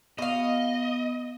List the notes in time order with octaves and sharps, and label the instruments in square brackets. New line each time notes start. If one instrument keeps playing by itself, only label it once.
[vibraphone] B3 [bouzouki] F#4 F5 [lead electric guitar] D#5